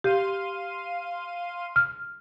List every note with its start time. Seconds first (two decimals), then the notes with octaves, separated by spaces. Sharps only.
0.04 G4 F5 C6 D#7
1.76 F6